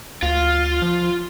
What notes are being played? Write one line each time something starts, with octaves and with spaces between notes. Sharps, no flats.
D2 F4
F3